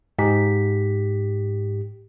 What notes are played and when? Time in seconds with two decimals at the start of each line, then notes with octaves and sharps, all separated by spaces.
0.19 G#2 G4 B6